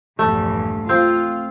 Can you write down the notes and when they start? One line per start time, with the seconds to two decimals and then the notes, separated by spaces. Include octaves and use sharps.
0.19 A#1 E2 G2 A3
0.89 C4 F4